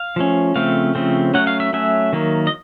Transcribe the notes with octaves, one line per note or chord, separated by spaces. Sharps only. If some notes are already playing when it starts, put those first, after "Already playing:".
Already playing: F5
F3 A3 C#4
C#3 F3 A3 C4 F5
C#3 F3 A3 C4
F#3 A3 C#4 F#5
F5
E5
F#3 A3 C#4 E5
D#3 F#3 A#3
D#5